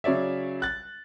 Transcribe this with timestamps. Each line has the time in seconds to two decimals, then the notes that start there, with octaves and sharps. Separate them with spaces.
0.04 C#3 F#3 C#5 D5 E5
0.62 F#6 A6